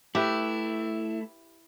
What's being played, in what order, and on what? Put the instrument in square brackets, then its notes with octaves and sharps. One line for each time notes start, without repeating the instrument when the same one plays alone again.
[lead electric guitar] A3 [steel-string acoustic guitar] E4 [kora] G4 B4